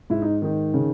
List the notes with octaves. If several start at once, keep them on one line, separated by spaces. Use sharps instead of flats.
G#2 E4
D#4
D#3 D#4
C#3